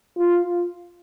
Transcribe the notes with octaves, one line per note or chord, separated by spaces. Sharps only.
F4